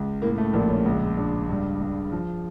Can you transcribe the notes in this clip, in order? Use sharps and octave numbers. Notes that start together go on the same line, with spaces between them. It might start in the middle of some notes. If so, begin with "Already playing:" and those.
Already playing: C#2
A2 A#3
A3
A#1 A#3
C#4
C#2
C#2 D4
G2
G2
F3